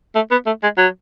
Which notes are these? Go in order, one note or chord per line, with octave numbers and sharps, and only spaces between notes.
A3
B3
A3
G#3
F#3